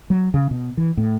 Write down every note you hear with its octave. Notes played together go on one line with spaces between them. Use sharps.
F#3
C#3
B2
E3
A2